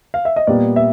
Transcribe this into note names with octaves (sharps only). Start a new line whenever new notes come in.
F5
E5
D#5
A#2 G3 B3 D5
E5